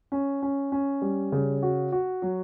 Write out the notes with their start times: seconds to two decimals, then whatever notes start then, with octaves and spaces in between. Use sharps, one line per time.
0.12 C#4
0.42 C#4
0.72 C#4
1.02 G3
1.32 C#3
1.62 F#4
1.92 F#4
2.22 F#3